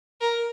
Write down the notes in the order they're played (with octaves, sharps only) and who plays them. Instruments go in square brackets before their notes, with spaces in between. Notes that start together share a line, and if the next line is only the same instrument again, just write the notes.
[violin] A#4